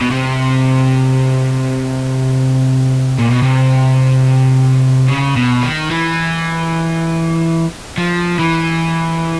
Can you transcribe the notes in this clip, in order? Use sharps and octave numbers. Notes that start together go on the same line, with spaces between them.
B2
C3
A#2
B2
C3
C#3
B2
D#3
E3
F3
E3